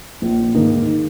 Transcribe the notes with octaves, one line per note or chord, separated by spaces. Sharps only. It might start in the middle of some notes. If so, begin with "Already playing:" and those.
A#1
G#2 D#3 A#3 D#4